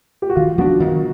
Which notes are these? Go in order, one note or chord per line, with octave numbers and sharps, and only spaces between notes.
G4
F#4
D#3 F4
F#3 B3 D4 F#4
D#3